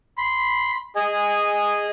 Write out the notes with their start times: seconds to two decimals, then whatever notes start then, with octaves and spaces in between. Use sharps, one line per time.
0.18 B5 C6
0.96 G#4 D#5 G#5